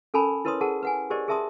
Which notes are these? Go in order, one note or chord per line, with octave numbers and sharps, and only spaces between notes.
C#4 A4 A#4 G#5 A5 B5
E4 A#4 B4 C#5 C6 D#6
G#4 A#4 F#5 A5
B4 F#5 G#5
G4 G#4 A#4 C5 D5 D#5
G#4 A#4 E5 A5 C6 D#6